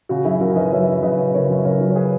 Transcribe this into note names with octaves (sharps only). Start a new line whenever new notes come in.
C#3 F#4
F#2 E4 G#4
C#3 F#4 A#4
F#2 B4 D#5
F#2 C#5 E5
F#2
C#3 B4 D#5
C#3
C#3 A#4 C#5
F#2
C#3 A#4 C#5
F#3
C#5
G#4 B4